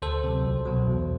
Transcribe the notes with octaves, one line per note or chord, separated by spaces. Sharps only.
D2 A4 C5
C3 F#3
C2
B2 F#3
E2